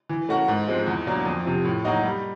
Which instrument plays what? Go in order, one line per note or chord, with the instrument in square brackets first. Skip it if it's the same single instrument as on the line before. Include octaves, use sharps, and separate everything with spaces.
[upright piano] E3
A3 C#4 F#4 A#4
G#2
F3 G#3 C4
E2
B2 F#3 A#3 D4
F2
C3 F3
A2
F#3 A#3 D#4 F#4
G3